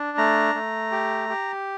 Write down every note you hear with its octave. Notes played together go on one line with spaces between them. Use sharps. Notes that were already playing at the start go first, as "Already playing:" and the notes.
Already playing: D4
A3 A#5
A3
G4
G4